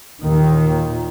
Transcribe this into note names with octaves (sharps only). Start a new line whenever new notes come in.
D#2 A#2 D#3